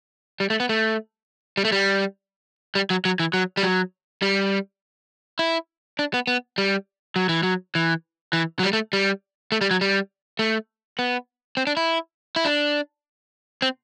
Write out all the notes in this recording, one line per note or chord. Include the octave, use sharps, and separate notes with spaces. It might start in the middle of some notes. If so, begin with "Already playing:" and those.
G3
A3
B3
A3
G3
A3
G3
G3
F#3
F#3
E3
F#3
G3
F#3
G3
E4
D4
B3
B3
G3
F#3
E3
F#3
E3
E3
F#3
G3
A3
G3
A3
G3
F#3
G3
A3
B3
C4
D4
E4
E4
D4
C4